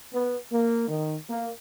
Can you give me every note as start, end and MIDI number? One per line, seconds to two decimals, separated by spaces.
0.13 0.37 59
0.52 0.86 58
0.88 1.16 51
1.29 1.50 58